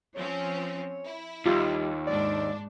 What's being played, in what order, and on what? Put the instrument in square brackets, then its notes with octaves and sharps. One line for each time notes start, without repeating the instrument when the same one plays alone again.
[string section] F3 C4 C#4 [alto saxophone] C#5
[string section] E4
[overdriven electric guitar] D#2 [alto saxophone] G3 [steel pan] F4
[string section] G#2 D4 [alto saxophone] D5